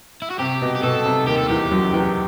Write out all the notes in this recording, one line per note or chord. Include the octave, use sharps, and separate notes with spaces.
E4
F#4
C3 G4
B2
G4
B2 A4
C3
D#2 D#3 G4
A4
E2 E3 G4
F#2 F#3
E2 E3